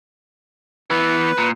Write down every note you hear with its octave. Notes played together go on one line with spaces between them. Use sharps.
E3 B3 B4
A#2